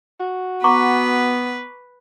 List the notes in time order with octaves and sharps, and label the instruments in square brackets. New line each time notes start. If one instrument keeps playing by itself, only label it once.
[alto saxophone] F#4
[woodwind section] B3 [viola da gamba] B4 [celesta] A#5 C#6 D6